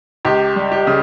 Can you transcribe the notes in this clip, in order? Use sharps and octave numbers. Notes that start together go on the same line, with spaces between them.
C#2 G4
G3
G4
C#3